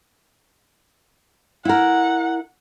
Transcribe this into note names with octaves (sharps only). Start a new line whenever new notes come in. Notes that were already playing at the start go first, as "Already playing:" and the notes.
E4 A#4 F#5